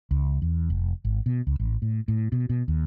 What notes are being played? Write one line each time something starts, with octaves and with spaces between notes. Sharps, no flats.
C#2
E2
F1
G#1
B2
C#2
A1
A2
A2
B2
B2
D#2